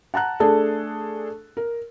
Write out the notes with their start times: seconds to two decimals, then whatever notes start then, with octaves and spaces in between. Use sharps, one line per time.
0.14 F#5 A5 A#5 F#6
0.40 A3 D4 G#4 A4
1.57 A#4